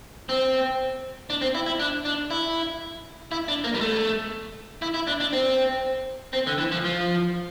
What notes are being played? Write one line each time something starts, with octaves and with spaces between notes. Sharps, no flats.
C4
D4
C4
E4
E4
D4
D4
E4
E4
D4
A#3
G3
A3
E4
E4
D4
D4
C4
C4
D3
E3
F3
F3